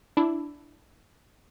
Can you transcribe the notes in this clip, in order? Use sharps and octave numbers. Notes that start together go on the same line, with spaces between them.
D4 E4